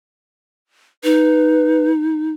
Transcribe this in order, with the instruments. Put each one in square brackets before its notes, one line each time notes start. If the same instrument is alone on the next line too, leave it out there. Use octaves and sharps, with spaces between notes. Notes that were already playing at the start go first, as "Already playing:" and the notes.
[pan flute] D#4 [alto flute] B4